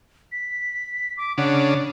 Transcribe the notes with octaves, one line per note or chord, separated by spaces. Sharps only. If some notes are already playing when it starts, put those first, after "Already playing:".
B6
D6
C#3 D4 F#5